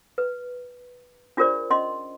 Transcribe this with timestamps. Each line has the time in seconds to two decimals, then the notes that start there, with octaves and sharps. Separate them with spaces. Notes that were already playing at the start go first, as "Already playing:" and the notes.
0.18 B4
1.37 D4 F4 G#4 A#4 C5 D5
1.70 C#4 D#5 C6